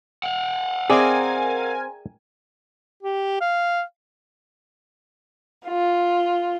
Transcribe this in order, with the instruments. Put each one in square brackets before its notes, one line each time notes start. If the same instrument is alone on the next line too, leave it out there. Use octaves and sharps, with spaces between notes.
[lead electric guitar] F5 F#5
[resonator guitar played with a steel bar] C4 [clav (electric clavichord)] G#4 D5 E5 [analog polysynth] A#4 G#5
[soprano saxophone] G4
F5
[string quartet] F4